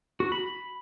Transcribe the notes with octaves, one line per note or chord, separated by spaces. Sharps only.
F#4
B5